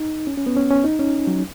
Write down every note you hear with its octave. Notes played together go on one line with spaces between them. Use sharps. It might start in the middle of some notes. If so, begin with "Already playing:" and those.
Already playing: D#4
C#4
C#4
B3
C#4
C#4
D#4
C#4
F#3